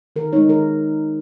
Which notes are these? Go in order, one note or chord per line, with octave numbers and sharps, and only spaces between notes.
D#3 A#4
G#3 D#4 C#5
D#3 A#4